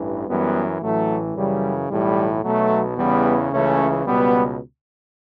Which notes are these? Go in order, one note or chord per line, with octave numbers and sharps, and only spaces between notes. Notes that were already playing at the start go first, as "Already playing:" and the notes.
Already playing: A1 G2 E3
F#2 E3 G3 B3
A1 A2 E3 F#3 A3
F#2 C#3 E3 G3
B1 A2 E3 G3
B1 B2 F#3 A3
E2 C#3 E3 G3 B3
C#2 C#3 E3 A3 C#4
C#2 B2 G3 B3